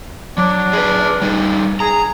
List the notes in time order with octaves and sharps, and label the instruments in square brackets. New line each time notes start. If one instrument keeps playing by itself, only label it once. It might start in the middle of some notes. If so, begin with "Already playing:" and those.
[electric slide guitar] F#3 [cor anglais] D4
[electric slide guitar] G#4 B4
G3 D#4
[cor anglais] G#4 [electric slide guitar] A#5